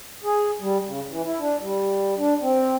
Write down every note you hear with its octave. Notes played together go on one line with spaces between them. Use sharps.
G#4
G3
C#3
E3
E4
D4
G3
D4
C4